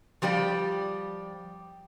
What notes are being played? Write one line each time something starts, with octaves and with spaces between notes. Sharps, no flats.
F3 G3 G4 D5